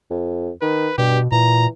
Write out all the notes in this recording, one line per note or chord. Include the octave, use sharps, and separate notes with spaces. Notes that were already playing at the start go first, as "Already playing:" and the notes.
F2
D#3 B4
G2 B2 G4
A#2 E3 A#5